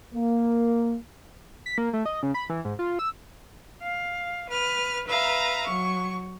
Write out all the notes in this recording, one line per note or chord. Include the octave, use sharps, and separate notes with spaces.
A#3
B6
A#3
A3
D#5
C#3
B5
E3
G#2
F4
E6
F5
B4 F6
B4 E5 F5 A#5
F#3 C#6